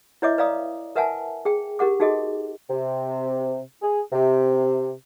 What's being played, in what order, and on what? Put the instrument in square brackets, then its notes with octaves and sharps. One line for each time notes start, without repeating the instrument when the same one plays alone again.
[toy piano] E4 B4 C#5 D#5 E5 D6
B4 D5 F5 A#5 D#6
A#4 B4 E5 F#5 G#5 A5
G#4 G5
G4 A#4 F#5 D6
D#4 F#4 G#4 A4 D#5
[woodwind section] C3
G#4
C3